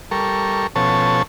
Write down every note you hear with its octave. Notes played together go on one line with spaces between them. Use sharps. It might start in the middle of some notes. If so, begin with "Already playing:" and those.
G3 A4 A#4 C#6
B2 F3 C#4 A4 C#5 A5